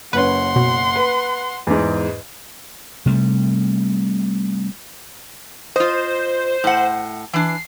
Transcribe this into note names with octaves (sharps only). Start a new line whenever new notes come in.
F#1 C#4 B4 F#5 C6
B2
B4
E2 G#2
C3 G3 A3
F4 C5 D#5
A2 F#5
E3 D4 C7